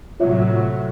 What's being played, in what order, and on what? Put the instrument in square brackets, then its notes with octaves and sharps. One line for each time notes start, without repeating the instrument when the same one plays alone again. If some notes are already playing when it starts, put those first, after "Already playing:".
[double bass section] A2 C3 F#3 [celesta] F4 C#5 E5